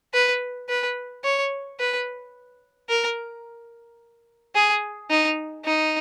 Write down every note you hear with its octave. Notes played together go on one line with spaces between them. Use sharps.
B4
B4
C#5
B4
A#4
G#4
D#4
D#4